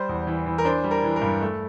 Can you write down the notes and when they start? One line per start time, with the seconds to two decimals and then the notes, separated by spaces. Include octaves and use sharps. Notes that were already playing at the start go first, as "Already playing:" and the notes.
Already playing: G3 C5
0.09 E2
0.27 E3
0.46 E3
0.58 A#4
0.65 D4 C5
0.84 G3
0.91 A#4
1.04 E3
1.16 A#4
1.22 G2
1.42 A3